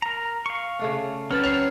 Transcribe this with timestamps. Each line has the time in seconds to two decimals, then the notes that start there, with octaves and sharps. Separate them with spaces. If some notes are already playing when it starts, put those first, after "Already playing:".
0.02 A#4 A#5
0.46 F5 C#6
0.79 C#3 A3 D4
1.31 F#3 C4 C#4 B4 F6 A6
1.44 C#5 C7 F7